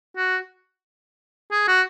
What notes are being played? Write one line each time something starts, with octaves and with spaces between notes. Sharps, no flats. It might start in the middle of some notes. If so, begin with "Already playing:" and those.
F#4
G#4
F#4